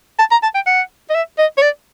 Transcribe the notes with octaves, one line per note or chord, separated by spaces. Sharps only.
A5
A#5
A5
G5
F#5
D#5
E5
D#5
C#5
D5